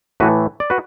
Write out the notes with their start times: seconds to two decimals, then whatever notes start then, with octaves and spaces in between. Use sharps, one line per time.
0.20 A2 E3 A3 F#4 B4
0.60 D5
0.70 F#4 B4